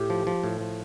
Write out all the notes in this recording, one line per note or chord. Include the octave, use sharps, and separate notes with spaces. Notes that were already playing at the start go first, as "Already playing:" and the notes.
Already playing: A2 G4
F3
F3
A2
F3